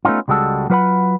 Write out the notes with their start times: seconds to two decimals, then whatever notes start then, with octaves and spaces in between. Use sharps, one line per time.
0.05 A3 B3 C#4 D#4 F4
0.28 C#2 G3 G#3 F#4 A4
0.70 F#3 F4 B4 C5 F#5 B5